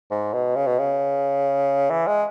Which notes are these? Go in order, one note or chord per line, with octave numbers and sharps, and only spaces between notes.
G#2
B2
C#3
B2
C#3
E3
G#3